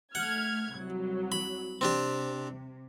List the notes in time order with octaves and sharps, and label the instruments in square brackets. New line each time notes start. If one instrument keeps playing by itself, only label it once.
[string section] A3 F6 G#6 [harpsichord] F#5
[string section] C2 F#3
[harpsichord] B5
[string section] C3 [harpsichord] C4 D4 G4